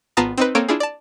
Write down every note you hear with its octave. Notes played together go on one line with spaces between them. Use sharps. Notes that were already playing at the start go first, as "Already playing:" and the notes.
G#1 B3 F4 A5 A#5 D#6
C4 D#4 B4
A#3 C4 A4 C#5 D7
D4 E4 F4 G#4
D5 A5